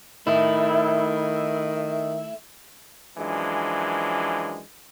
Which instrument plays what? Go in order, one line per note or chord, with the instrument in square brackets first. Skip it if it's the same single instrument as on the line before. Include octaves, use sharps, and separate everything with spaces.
[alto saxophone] D#3 [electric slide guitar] A3 E4
[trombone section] F#2 E3 F3 G#3 D4